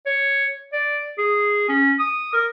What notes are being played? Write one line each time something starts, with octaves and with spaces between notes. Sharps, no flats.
C#5
D5
G#4
C#4
D#6
A#4